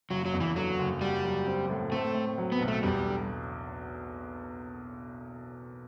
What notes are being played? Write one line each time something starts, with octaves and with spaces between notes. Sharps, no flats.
F#1 F#3
F#3
E2
E3
D3 F#3
F#1
G3 F#4
F#3
C4
A2
A3 C4
A2
F#3
B3
B1
A3
E2 G3
D3